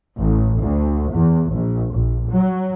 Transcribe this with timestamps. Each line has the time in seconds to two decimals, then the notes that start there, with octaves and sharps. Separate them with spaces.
0.18 A1
0.59 D2
1.12 E2
1.52 A#1
1.93 A#1
2.28 F#3